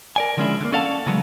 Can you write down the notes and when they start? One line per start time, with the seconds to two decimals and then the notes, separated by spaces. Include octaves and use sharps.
0.16 A#4 D5 G#5
0.37 D3 F3 G#3 C#4 D4 E4
0.61 D3 A#3
0.73 C#4 A4 D5 F5 F#5 A5
1.06 C#3 E3 F#3 G#3 A3 B3